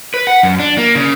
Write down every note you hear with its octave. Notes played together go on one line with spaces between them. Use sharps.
B4
F#5
F#2
D4
A#3
C#3